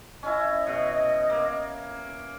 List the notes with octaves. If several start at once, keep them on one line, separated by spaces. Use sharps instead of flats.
C#4 E4 D#5
B2
A#3